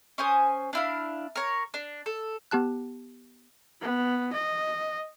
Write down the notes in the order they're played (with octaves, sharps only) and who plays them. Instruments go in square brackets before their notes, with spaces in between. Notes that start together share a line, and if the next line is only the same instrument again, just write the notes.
[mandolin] C#4 C5 G#5 D#6
D4 E4 F5
A#4 C#5
D4
A4
[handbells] B3 G4 A5 F#6
[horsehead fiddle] B3
D#5